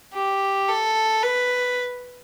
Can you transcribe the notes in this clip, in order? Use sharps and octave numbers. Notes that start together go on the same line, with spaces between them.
G4
A4
B4